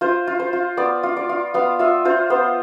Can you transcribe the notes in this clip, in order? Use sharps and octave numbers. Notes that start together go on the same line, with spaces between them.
F4 C5
F4
C5
F4
B3 D5
F4
D5
F4
B3 F5
F4 E5
F4 C5
B3 C5